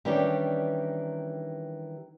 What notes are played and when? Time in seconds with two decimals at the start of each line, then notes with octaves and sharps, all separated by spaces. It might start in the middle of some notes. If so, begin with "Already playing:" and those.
0.05 D#3 E3 G3 C#4 D4 G4